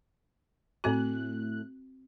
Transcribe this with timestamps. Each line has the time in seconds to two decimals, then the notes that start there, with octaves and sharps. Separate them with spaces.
0.84 A2 A3 C4 F#4 F#6